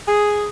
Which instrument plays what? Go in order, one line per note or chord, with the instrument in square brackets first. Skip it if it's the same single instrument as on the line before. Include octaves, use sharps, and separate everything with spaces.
[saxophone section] G#4